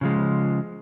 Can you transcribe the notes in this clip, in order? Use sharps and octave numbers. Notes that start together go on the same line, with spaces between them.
C#3 F3 G#3